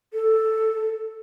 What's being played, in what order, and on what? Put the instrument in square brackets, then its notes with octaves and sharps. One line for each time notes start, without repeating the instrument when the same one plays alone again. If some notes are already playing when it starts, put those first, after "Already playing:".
[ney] A4